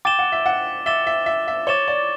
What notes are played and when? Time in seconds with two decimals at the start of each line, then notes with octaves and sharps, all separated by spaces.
0.05 G5 D6 A6 E7 G7
0.19 F#5
0.32 E5
0.46 F#5
0.86 E5 D6 A6 E7 G7
1.07 E5
1.26 E5
1.48 E5
1.67 C#5 D6 A6 E7 G7
1.88 D5